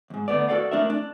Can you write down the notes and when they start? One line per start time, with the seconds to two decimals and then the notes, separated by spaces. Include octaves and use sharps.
0.10 D#2 G#2
0.28 D3 A3 B3 D5
0.48 F#4 A4 D5 F5
0.71 A3 D4 A#4 E5
0.90 D4